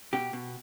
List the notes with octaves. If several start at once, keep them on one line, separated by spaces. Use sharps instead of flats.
B2 G4
B2